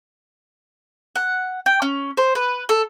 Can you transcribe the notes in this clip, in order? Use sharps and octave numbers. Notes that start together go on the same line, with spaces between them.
F#5
G5
C#4
C5
B4
A4